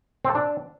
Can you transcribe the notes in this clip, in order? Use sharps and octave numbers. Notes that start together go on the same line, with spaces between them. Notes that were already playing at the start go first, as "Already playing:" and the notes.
C4
A4
D4